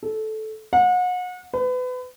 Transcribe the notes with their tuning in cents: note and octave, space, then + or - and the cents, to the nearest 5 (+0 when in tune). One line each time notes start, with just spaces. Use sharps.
A4 -15
F#5 -35
B4 +30